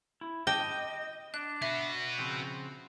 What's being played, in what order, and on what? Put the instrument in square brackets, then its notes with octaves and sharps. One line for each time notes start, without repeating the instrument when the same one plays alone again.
[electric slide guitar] E4
[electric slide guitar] D#5 [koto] G5 [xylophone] A5 D6 G6
[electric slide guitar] D4 [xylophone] F#6
[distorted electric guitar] F#4 B4 [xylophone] E5
[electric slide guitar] C#3 F3 C4